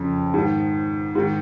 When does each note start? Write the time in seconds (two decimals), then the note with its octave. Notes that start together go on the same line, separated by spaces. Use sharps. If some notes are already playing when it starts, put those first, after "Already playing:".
Already playing: F2 C#3
0.34 G#2 D#3
1.15 G#2 D#3